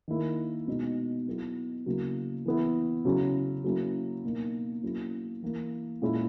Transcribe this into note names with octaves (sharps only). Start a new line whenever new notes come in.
D#3 A#3 E4
B2 G#3 D#4
F#3 B3 E4
C#3 F#3 A#3 E4
E3 B3 E4
C#3 F#3 C#4 E4
F#3 A#3 C#4 E4
B2 A#3 D#4
F#3 A#3 C#4 E4
E3 A#3 E4
A#2 G#3 C#4 E4